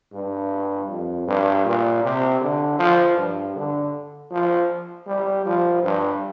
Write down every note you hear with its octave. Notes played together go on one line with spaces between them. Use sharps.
G2
F2
G2
A#2
C3
D3
F3
G2
D3
F3
G3
F3
G2